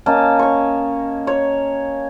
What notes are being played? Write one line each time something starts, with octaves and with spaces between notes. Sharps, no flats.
A#3 C#4 D#5 A5
C#5 C#6
C#5